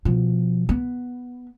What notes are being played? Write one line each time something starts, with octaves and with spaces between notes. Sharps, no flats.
B2 F3
B3